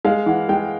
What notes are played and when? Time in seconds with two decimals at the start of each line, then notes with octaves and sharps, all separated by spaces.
0.05 G#3 F5
0.26 E3 F#5
0.49 G#3 G5